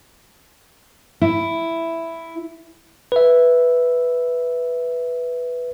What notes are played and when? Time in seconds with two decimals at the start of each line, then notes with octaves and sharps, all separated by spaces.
1.22 E4
3.12 B4 E5